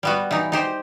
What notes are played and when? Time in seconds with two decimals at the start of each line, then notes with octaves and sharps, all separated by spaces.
0.03 G3 B3 F#4
0.31 E3 D#4
0.52 D#4 G4 C5